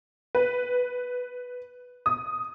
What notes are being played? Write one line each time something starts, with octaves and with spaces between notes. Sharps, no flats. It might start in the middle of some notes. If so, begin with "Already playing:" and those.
B4
D#6